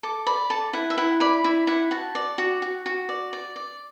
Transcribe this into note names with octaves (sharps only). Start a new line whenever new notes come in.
A4 D6
D5 B5
A4 A5
E4 F#5
E5
E4 F#5
D5 B5
E4
E4 F#5
F#4 A5
D5
F#4
F#4
F#4
D5
D5
D5